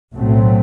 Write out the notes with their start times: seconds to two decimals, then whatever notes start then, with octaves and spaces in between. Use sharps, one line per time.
0.14 B1 A2 F#3 A3 C4